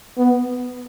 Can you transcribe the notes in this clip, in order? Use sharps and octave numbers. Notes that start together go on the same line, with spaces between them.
B3